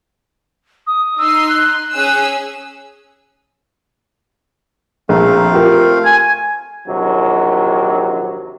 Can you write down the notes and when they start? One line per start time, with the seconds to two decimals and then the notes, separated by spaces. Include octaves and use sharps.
0.87 D#6
1.18 D#4 C6 E6
1.49 F#6
1.92 C#4 G#4 E6
5.09 A#1 A3 C4 F5
5.53 F4 G4 A#4
6.05 G#5
6.86 A#1 D#2 C3 F#3